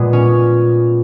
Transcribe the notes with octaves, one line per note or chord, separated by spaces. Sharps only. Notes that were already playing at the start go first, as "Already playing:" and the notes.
Already playing: A#2 G#3 B3
C#4